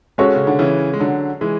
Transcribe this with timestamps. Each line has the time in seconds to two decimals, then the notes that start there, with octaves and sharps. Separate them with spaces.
0.18 G#3 C#4 F#4 A4 C#5
0.35 C#3
0.47 D3
0.59 C#3 E3
0.93 G#3
1.00 D3 F#3
1.41 E3 G#3